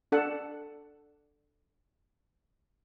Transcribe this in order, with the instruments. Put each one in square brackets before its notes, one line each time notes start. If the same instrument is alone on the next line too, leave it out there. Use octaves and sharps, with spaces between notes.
[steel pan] D4 A4 F#5